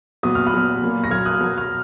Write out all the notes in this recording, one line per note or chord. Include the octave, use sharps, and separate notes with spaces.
A#2 F#3 B3 D#6
F6
B5 D#6
A#2 F#3 B3
A#2 F#3 A#3
A#6
A#2 F#3 A#3 F6 G#6
D#6 F#6
B2 F#3 B3
F6